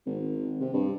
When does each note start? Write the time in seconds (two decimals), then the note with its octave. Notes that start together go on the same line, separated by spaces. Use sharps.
0.06 G#1
0.60 C3
0.74 G2